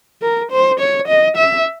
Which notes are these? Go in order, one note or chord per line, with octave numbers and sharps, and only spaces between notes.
A#4
C5
C#5
D#5
E5